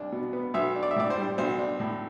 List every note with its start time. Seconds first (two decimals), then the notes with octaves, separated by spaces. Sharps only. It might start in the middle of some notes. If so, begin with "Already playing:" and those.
Already playing: C2 D4
0.12 B2
0.33 B3
0.54 B1 E5
0.76 D4
0.83 D5
0.91 E5
0.96 A2 D5
1.10 C5
1.17 G3
1.38 B1 C5
1.59 D4
1.80 A2